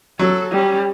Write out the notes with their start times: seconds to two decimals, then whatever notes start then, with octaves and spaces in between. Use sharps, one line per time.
0.19 F#3 A4
0.51 G3 C#4